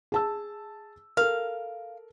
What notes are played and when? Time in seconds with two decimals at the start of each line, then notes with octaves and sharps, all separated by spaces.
0.12 G#4 A5 E6
1.17 A4 A#4 F5